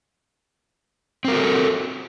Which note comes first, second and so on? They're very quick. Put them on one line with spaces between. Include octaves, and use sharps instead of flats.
C4 A#4 F#4 A4